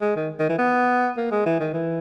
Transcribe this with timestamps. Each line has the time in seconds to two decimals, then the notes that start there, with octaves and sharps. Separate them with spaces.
0.01 G#3
0.16 D#3
0.39 D#3
0.49 E3
0.58 B3
1.17 A#3
1.31 G#3
1.46 E3
1.60 D#3
1.74 E3